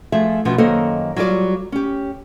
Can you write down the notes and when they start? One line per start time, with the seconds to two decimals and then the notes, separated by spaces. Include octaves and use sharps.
0.12 F3 A3 G#4 E5
0.45 B2 F3 B3 C#4
0.58 F#2 D#3 A#3 A4 C5 D#5
1.16 F#3 G3 F4 G4 D5
1.72 C#4 G4